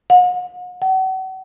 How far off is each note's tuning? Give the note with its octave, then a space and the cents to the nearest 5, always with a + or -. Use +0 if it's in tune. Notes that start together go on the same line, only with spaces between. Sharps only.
F#5 -40
F#5 +40